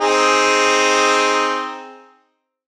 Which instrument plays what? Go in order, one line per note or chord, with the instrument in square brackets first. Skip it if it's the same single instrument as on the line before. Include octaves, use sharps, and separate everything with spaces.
[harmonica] C4 D#4 G#4